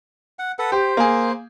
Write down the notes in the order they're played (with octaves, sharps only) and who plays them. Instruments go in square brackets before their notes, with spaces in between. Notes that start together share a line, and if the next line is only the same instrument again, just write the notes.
[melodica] F#5
A4 B4 F#5
[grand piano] G4 [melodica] C5
[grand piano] A#3 G#4